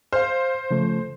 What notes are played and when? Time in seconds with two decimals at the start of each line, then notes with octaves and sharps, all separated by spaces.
0.12 C5 F5 F6
0.71 C#3 F3 A3